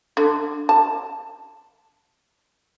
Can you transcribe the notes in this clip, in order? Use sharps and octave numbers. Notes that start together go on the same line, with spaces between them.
D3
A5